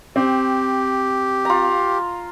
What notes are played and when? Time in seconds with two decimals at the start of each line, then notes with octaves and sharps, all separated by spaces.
0.16 C4 G4
1.45 F4 A#5